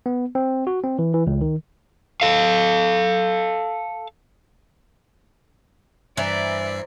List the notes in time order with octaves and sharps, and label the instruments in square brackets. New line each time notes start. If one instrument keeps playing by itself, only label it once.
[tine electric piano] B3
C4
F#4
C4
E3
E3
C#2
D#3
[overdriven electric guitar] A4 F5
[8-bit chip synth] G2 E5 C7 [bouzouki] E3 [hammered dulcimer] C5 G#5 A#5 [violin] D5